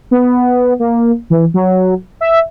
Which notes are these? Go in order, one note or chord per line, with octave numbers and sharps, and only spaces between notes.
B3
A#3
E3
F#3
E5